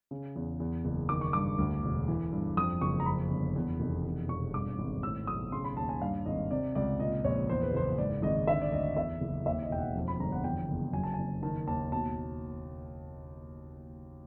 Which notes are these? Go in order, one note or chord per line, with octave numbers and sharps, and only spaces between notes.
C#3
E2
E2
F#1
D#3 D6
C#6
G2 D6
D2
E1
E3
G2
F2 D#6
F#1 C#6
A#5
F2 B5
G1
E2
F1
E2
E1 C#6
G2 D6
G#1
A2 E6
B1 D#6
C#3 C6
B5
D#2 A5
G#5
G2 F5
G#1 D#5
C3 D5
C#2 D5
A#2 D#5
A#1 C#5
E2 C5
B4
F#1 C5
G#2 D5
G#1 D#5
D3 E5
D5
D2 D#5
E2 E5
F#1
D#2 E5
D#5
E1 G5
F#5
F2
B5
G1 A#5
F#5
E2 G5
F#1
F#2 G#5
A5
F#1 G#5
D#3 A5
D#2 A5
B2 A5